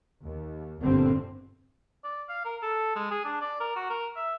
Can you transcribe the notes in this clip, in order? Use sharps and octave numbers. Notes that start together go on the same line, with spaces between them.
D#2
G1 A#2 D3 G3 C4
D5
F5
A#4
A4
G#3
G#4
D4
D5
A#4
F#4
A#4
E5